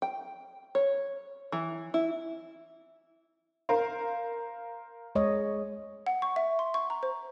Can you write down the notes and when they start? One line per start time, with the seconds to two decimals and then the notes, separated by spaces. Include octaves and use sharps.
0.02 G5
0.75 C#5
1.52 E3
1.94 E4
3.69 A#4 C5 F5
5.15 G#3 C#5 D#5
6.07 F#5
6.22 C#6
6.36 E5
6.59 C6
6.74 C#6
6.90 A#5
7.03 C5